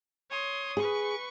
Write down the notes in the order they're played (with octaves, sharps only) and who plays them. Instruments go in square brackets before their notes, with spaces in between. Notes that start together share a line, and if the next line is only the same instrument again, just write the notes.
[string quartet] C#5 C6 D#6
[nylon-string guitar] G#4 [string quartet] B4 C#6